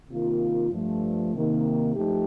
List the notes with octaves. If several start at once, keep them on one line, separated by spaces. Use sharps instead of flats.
C3 D#3 A#3 F4
G2 F3 A3
C3 D#3 A#3
G2 F3 A3 D#4 G4